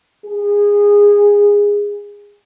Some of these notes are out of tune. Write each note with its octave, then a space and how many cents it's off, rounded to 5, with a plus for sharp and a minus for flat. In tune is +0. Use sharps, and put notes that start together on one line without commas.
G#4 -20